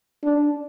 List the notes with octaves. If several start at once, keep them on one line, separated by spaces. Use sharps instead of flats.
D4